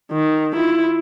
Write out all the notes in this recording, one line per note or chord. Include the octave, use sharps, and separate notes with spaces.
D#3
E4 F4